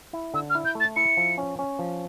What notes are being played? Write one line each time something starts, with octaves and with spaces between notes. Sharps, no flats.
E4
D3 E6
F6
E4
G6
A3
A6
E4 C#7
F3
C#4
C#4
F3